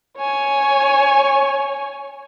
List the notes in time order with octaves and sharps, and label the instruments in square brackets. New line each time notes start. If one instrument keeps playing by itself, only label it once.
[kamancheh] C#5 G#5